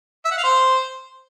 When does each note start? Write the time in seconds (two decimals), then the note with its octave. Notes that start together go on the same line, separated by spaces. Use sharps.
0.25 E5
0.31 F#5
0.37 F5
0.44 C5